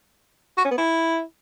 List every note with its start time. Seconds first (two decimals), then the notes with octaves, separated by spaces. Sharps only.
0.57 F#4
0.64 C#4
0.71 B3
0.78 E4